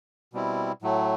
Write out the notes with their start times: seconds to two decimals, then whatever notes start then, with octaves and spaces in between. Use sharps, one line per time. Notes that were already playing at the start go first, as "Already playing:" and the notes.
0.33 B2 G3 C4 E4
0.82 A2 F#3 A3